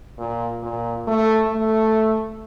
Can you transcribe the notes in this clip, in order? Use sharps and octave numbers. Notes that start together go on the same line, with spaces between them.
A#2
A#2
A3
A3